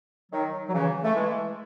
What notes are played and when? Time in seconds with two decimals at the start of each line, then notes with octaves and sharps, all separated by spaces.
0.32 D#3 F#3
0.69 F#3
0.73 C#3 E3
1.04 A3
1.15 E3 G#3